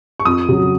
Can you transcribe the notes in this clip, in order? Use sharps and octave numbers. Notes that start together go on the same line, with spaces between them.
C#6
F2 D#6
C#3 F#3